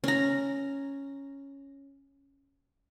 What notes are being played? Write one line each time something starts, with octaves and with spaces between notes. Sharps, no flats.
C#4 A#5